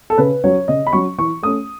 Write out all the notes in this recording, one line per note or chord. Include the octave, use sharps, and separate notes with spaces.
A4
C#3 B4
F#3 C#4 C#5
C#3 D#5
B5
F#3 C#4 C#6
E3 C#6
A3 C#4 D#6